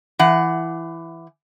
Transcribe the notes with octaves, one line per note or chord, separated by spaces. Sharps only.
E3 F#5